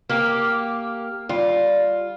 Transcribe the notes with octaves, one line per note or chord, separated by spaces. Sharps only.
A#3 G4 A#4
G3 F4